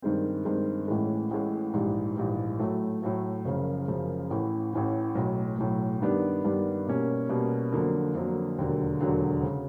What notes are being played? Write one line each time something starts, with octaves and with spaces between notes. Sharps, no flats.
G2 D#3 G#3 C4
G2 D#3 G#3 C4
A1 A2 E3 G#3
A1 A2 E3 G#3
A#1 G#2 E3 G3
A#1 G#2 E3 G3
A2 F#3 A3
A2 F#3 A3
F#1 F#2 C#3 F3
F#1 F#2 C#3 F3
A1 A2 E3
A1 A2 E3
B1 A2 F#3
B1 A2 F#3
G2 D#3 G3 B3 D4
G2 D#3 G3 B3 D4
B2 G3 A#3 C#4
B2 G3 A#3 C#4
F2 D3 F#3 A#3
F2 D3 F#3 A#3
E1 D#2 D3 F#3
E1 D#2 D3 F#3
C#3